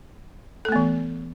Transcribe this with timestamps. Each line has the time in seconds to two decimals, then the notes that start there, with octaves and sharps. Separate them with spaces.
0.65 A4
0.69 A3
0.72 B3
0.76 E3